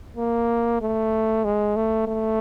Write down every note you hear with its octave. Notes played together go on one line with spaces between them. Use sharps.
A#3
A3
G#3
A3
A3